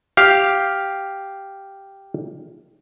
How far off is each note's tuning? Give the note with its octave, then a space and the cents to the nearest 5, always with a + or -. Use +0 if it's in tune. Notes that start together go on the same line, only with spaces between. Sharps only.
G4 +0 F5 +0